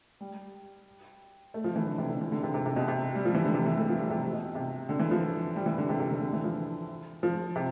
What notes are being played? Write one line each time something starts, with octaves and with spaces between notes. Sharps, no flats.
G3
A3
F3
E3
D3
C3
D3
E3
D3
C3
C3
C3
B2
C3
G3
F3
E3
D3
C3
E3
A3
F3
G3
C3
B2
C3
D3
E3
F3
G3
E3
D3
C3
C3
D3
D3
E3
F3
F3
C3